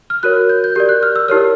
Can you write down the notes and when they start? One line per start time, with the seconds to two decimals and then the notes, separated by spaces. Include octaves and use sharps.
0.10 F6
0.23 F#4 A#4 C#5 F#6
0.49 G6
0.64 G6
0.75 G4 A#4 D5 G6
0.89 F#6
1.03 F6
1.16 E6
1.28 E4 G4 A#4 C#5 F6